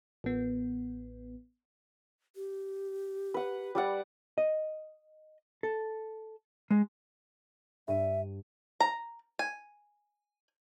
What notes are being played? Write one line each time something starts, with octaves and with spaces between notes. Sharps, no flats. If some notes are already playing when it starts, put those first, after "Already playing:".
A1 B3
G4
B4 F#5
G3 D5 F#5
D#5
A4
G#3
G2 E5 D#7
A#5
G#5